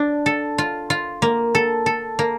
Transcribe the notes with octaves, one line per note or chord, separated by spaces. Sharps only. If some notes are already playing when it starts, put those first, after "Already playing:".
Already playing: D4
A4
F4
F4
A#3
A4
A4
A#3